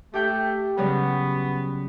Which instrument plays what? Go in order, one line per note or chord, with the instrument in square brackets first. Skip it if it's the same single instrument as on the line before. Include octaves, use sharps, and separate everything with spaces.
[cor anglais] A3 [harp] G4 G5 G6
[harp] C#3 F#3 G3 [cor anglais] B3